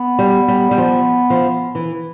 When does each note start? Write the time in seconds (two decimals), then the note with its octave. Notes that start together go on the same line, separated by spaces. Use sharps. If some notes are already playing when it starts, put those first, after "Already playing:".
Already playing: B3
0.19 G3
0.48 G3
0.71 G3
0.78 F3
1.30 F3
1.75 E3